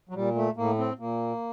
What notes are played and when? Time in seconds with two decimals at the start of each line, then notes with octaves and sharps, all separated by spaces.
0.09 F#3
0.14 A#2 G3
0.35 A3
0.57 A2 A#3
0.78 C4
0.99 A#2 A#3